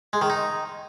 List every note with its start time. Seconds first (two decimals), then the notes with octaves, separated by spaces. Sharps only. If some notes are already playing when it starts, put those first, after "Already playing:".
0.13 G#3
0.21 D#3
0.30 D#4